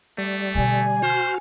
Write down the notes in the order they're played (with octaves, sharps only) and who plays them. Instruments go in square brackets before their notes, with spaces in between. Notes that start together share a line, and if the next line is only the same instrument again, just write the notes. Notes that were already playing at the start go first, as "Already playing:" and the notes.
[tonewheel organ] G3 [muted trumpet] A3
[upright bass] B2 D3 [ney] G#5
[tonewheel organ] F#4 F6 [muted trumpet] C5